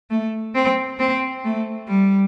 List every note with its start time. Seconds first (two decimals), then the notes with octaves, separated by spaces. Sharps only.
0.10 A3
0.55 C4
0.99 C4
1.44 A3
1.88 G3